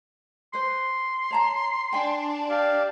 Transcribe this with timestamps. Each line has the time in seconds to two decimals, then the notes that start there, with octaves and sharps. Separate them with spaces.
0.54 B4 C5 C6
1.31 C#5 A5 A#5
1.93 D4 G5 G#5
2.50 G4 D5 F5